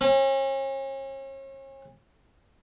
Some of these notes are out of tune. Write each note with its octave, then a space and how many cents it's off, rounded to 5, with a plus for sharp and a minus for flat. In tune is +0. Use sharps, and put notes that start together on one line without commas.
C#4 -40